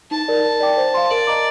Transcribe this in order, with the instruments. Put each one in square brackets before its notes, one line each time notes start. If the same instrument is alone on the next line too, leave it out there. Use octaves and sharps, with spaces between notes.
[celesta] D#4 [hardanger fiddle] A5
[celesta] A#4 D5
A#4
D5 G5 D6
C5
F5 C6
[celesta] A#4 [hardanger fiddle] D5
[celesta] D#5 A#5 D6